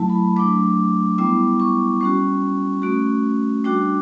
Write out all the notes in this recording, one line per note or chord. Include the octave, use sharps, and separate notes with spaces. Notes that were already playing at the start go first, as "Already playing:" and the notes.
Already playing: F#3 A3 E4 A5
B5
F#3 A3 D4 D6
G3 B3 E4 D6
C#6
G3 C#4 F#4 C#6
A3 C#4 F#4
G3 D4 F#4 D6